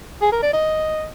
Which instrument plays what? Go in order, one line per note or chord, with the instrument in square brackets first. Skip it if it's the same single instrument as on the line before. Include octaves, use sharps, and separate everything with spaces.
[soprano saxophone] G#4
A#4
D5
D#5